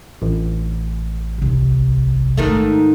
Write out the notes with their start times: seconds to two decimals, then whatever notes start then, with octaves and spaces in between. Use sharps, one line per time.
0.22 A1
1.38 F1 C2
2.37 G#2 D#3 A3